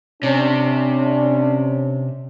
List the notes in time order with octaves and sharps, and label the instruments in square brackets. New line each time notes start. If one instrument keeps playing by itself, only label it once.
[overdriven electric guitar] C3 [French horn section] C#4 D4